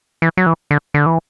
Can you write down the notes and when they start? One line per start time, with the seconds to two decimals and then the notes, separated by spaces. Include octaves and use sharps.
0.22 E3
0.37 F#3
0.46 E3
0.71 D3
0.94 D3
1.06 E3